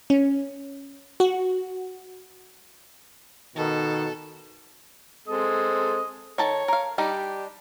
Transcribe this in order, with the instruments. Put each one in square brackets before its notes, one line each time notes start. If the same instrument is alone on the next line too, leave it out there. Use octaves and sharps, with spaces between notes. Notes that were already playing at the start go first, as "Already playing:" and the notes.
[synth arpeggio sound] C#4
F#4
[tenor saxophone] B2 [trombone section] D#3 [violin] A4
[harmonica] G#3 C4 A4 [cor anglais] D#5
[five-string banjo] D#3 A4 A5 [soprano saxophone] C#5
[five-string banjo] A#4 F5
[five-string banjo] G3 D4 D#4 [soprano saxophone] G4